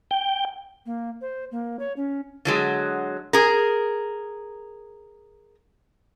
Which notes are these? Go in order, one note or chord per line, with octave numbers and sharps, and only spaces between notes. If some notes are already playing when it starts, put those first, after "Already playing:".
G5
A#3
C5
A#3
C#5
C#4
D3 F#3 G#3
G#4 A#4